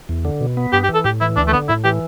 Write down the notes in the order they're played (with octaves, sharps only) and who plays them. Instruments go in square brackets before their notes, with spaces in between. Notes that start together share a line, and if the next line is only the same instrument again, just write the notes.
[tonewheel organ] E2
D3
B2
B3
[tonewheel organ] G2 [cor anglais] G4
[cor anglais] G4
[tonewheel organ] E3
[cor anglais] A4
[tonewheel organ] A2 [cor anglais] G4
[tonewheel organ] E3 [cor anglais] E4
[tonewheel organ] D2 [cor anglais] D4
[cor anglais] A3
[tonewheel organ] D3 [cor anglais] B3
[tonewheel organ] A2 [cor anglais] E4
[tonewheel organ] E3 [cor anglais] G4